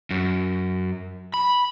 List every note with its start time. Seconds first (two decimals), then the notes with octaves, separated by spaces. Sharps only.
0.10 F#2
1.34 B5